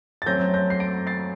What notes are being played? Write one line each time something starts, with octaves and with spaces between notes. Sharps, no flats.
A6
F#2 F#3 A3 C4 G6 A#6
G6 A#6
C7
A#6 D7
A6 C7